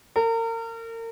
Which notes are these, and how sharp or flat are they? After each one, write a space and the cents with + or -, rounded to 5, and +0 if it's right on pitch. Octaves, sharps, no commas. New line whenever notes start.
A#4 -35